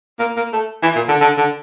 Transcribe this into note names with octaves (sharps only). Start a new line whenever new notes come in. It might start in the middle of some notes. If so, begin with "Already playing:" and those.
A#3
A#3
A3
E3
A#2
D3
D3
D3